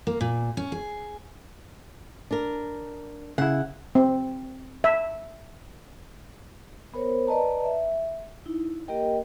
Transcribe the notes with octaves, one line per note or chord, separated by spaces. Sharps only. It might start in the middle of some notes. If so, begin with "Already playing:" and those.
A#3
A#2
C#4
G#4
D4 A#4
C#3 E4 F#5
C4
E5
B3 A#4 C5 C#5
B4 D5 D#5 A5 A#5
E5
D#4 E4
A#3 G4 A#4 D#5 G5